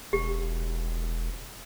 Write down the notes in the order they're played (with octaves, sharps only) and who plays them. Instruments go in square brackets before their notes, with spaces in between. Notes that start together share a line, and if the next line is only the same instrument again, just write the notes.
[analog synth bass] E1 [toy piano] G4